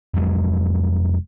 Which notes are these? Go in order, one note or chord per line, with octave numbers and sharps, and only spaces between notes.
F1 F2 F#3 G#3